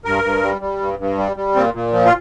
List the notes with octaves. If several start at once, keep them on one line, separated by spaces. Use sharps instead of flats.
G2 A#4
G2
G3
G3
G2
G2
G3
G3
A#2 C4
A#2
F3
F4